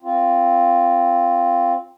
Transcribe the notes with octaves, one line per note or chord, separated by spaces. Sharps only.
C4 F4